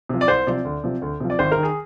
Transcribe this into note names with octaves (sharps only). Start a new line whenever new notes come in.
C3 F3
D5
C2 C5
C3 F3 D5
D2
C3 F3
D2
C3 F3
D5
G#1 C5
A#4
D#3
G#4